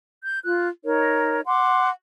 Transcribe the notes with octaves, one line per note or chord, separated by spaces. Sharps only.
G6
F4 F#6
D#4 A#4 C#5
F#5 C6 D6